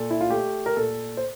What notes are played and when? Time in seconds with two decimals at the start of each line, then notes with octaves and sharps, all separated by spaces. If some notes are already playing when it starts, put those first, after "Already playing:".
Already playing: A#2 A4
0.10 E4
0.21 F4
0.30 A3 G4
0.66 A#4
0.77 A#2 A4
1.17 C5